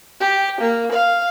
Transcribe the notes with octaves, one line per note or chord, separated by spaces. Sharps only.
G4
A#3
F5